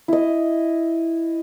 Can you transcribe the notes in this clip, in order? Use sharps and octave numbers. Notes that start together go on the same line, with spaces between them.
E4 D#5